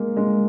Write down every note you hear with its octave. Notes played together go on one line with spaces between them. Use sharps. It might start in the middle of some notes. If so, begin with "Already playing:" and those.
Already playing: G#3 A#3
G#3